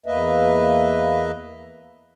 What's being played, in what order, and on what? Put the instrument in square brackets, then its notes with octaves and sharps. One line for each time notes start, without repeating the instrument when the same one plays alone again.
[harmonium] E2 A#3 B4 D#5 E5